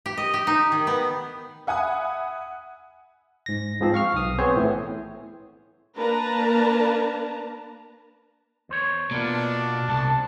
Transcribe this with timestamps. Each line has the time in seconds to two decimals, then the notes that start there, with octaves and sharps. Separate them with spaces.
0.06 G4
0.17 D#5
0.34 G4
0.47 D#4
0.72 D#3
0.87 B3
1.67 E5 F#5 G#5 B5 D#6
3.46 G#2 A#6
3.81 G#2 F3 C4
3.94 F5 C#6 F6
4.14 B1 D#6
4.38 B3 C4 G#4 C5 C#5
4.57 A2 E3 A3
5.95 A#3 D4 A#4 B4 A5 A#5
8.69 E2 C5 C#5
9.11 B2 A#3 D4 F4
9.89 C2 A5